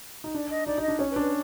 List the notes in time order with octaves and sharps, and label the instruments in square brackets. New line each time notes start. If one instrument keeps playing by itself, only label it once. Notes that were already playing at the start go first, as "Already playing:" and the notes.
[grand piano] D#4
[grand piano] D4 [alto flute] D5
[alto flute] D#5
[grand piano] D#4 [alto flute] D5
[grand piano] D#4 [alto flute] D#5
[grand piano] D4
[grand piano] C#4 [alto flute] C#5
[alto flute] B4
[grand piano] D4
[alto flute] B4